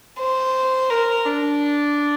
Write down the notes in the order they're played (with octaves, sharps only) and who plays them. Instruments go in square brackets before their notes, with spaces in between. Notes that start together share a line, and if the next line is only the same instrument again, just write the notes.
[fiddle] C5
A#4
D4